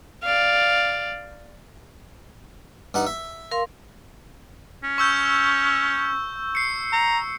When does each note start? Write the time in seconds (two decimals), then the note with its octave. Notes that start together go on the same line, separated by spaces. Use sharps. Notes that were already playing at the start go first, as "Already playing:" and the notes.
0.23 D5 F5
2.94 G2 D#4 F#5
3.07 E5
3.51 A#4 F5 C6
4.84 C#4
4.98 C#6 E6 G6
6.55 C7 C#7
6.93 A#5